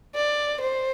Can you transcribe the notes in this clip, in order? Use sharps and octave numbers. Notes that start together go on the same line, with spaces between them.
D5
C5